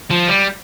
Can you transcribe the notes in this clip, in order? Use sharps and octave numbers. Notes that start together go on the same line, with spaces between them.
F3
G3